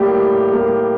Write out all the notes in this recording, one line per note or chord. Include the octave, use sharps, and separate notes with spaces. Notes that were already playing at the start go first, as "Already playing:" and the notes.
Already playing: A2 G3 A#3 G4
A2
G3 A#3